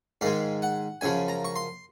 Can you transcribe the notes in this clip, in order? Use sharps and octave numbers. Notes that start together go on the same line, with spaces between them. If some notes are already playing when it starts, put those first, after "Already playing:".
G#2 D#3 G#3 F5
F#5
F#2 C#3 F3 G#5
A#5
C#6
C6